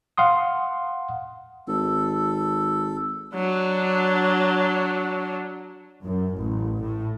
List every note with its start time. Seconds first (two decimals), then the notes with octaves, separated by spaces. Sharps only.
0.18 F5 F#5 C6 D#6
1.68 G#1 A4
3.34 F#3 D4
6.03 F#2
6.36 A1
6.82 A2